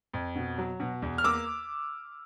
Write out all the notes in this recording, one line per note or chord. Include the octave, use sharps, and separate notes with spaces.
F2
B2
F#3
B2
E2
F6
A#3 D6 E6